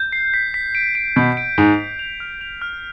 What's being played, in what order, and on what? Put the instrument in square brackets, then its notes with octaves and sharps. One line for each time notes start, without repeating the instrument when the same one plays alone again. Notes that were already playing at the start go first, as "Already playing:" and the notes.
Already playing: [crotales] G6
C7
B6
B6
D7
D7
[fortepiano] B2 [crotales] G6
[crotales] D7
[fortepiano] G#2 [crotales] F7
[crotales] B6
F7
F6
F7
F6